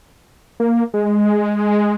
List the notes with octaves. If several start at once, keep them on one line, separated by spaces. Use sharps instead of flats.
A#3
G#3